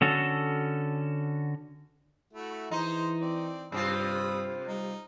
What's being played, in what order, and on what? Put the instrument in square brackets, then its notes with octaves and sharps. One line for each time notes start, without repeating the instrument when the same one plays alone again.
[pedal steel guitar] D3 C#4 F#4 A4
[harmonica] A3 E4 F#4
[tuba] E3 [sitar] D#4 [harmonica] G#4 C5
[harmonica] C4 D5
[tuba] G2 [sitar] C3 C4 F4 [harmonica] B5 D#6 E6
[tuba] G3 [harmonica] D#4